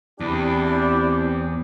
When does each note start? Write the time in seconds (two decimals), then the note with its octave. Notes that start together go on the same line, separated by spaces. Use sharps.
0.20 E2 C4 D4 E4 G4